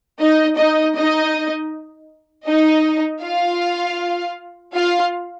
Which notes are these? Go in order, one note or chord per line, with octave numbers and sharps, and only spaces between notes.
D#4 D#5
D#4 D#5
D#4 D#5
D#4 D#5
F4 F5
F4 F5